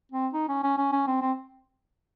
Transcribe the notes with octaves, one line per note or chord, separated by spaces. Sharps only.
C4
D#4
C#4
C#4
C#4
C#4
C4
C4